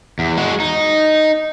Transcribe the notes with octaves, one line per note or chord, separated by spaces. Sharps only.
E2
G#3 F#4
D#4